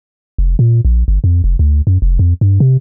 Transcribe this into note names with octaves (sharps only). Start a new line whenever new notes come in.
F1
A#2
A#1
G1
F2
F1
D2
F#2
F1
F2
G2
C3